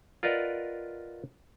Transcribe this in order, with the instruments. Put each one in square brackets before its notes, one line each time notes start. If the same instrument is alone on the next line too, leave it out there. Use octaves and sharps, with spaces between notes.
[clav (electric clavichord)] F4 A#4 B4 D5 D#5 F#5